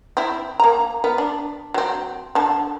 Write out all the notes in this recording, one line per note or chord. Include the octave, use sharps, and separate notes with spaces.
C4 E4
A#3 A#5
B3 A#4
D4
F#3 C4
D3 A5